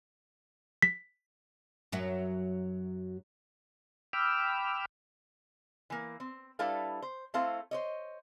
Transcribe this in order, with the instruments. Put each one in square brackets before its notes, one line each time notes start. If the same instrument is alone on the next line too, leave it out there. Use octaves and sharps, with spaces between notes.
[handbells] B6
[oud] F#2 F#3 E5
[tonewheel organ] G5 B5 D6 E6 F6
[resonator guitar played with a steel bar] E3 A#3
C4
G3 D4 E4 A4 B4 F5
C5
A3 C4 E4 A4 C5 F5
C5 C#5 D#5